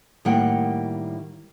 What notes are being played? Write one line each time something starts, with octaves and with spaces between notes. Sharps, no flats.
A2 D#3 G3 A#3 F#5 G5